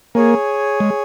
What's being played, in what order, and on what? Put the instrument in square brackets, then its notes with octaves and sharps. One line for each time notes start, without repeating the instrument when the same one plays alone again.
[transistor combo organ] A#3 [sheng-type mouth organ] G#4 C#5 G#5
[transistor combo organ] G#3